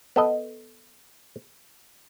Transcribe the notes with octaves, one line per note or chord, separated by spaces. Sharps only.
B3 A4 D#5